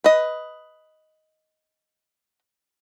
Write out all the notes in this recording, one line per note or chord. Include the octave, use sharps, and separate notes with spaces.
B4 D#5